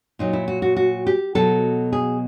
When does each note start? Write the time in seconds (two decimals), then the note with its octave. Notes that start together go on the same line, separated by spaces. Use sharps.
0.19 A#2 F#3 D#4
0.33 E4
0.48 F#4
0.62 F#4
0.77 F#4
1.07 G4
1.35 B2 F#3 A4
1.93 G#4